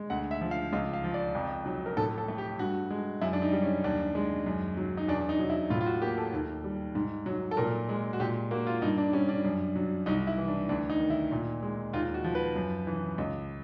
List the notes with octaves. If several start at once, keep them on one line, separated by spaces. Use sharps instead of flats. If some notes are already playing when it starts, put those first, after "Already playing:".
Already playing: G#3
D2 F#5
E5
F3
F5
C#2 F5
F5
F3
D5
F2
F#3
A#4
A2 A4
A4
A3
G4
G2 F#4
G#3
F#2 E4
D4
D#4
G3
C#4
D#2 D4
G#3
F#2
F#3
D#4
E2 D4
D#4
F#3
E4
A2 F4
F4
F#4
A#3 G4
A4
D#2
G3
G#2
F#3
A4
A#2 A#4
G#3
F#4
A#2 G4
A#3 F#4
F4
G2 D#4
D4
G3 C#4
D4
F#2
F#3
C2 D#4
E4
E3
D4
D2 D4
D#4
D#3
E4
A#2
G#3
D#2 F4
F#4
F3
B4
F#2
E3
C#2